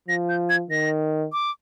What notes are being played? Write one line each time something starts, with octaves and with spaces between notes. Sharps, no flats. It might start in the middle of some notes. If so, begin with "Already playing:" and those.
F3 A#6
G6
G#6
D#3 A#6
D6